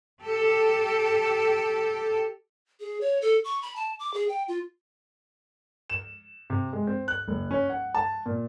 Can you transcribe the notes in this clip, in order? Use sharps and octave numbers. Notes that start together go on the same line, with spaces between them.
G4 A4
G#4
C#5
A4
C#6
B5
A5
D6
G#4
G5
F4
E7
C3
G#3
C4
F#6
F#1
C#4
F#5
A5
A#2